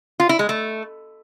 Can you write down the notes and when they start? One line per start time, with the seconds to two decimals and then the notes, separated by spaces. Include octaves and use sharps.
0.20 F4
0.29 E4
0.39 G#3
0.49 A3